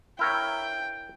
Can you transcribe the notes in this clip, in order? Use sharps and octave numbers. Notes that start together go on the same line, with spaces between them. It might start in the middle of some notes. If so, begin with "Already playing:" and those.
E4 A#4 C#5 G5